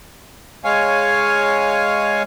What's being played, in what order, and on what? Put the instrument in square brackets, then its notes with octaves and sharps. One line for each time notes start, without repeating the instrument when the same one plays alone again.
[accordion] G#3 C#5 F5 G#5